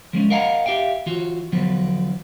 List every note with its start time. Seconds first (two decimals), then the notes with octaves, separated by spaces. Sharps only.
0.13 F3 G#3 C#4
0.30 A#4 D#5 F5 F#5 G#5 A#5
0.66 G4 E5 F5 G5
1.06 E3 F4 F#4
1.52 E2 D3 F3 F#3 B3